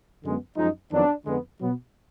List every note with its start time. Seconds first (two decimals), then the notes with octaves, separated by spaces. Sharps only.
0.23 F#2 D3 G#3 B3
0.57 F#2 F3 G#3 D#4
0.91 F2 D#3 F#3 B3 D4
1.25 F2 D3 G#3 B3
1.59 B2 F#3 B3